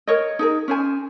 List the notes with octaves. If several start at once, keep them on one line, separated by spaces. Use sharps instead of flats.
A#4 C#5 D#5
D#4 G#4 A#4
C#4 C5 G#5